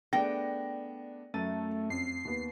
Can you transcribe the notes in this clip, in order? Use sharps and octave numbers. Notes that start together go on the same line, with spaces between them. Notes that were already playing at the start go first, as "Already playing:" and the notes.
A3 B3 D4 G#4 D5 G5 A#6
F#2 A3 A6 D#7
F2 C7
D#2 B3